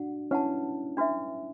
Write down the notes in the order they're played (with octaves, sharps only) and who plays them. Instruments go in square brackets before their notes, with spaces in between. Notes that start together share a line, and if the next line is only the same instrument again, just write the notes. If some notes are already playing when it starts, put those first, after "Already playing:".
Already playing: [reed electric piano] D4 F#4 [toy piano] F#5
[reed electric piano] C#4 E4 [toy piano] B4 F#5 A5
[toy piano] D4 F#4 B4 E5